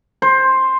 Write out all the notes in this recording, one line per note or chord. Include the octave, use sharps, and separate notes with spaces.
C5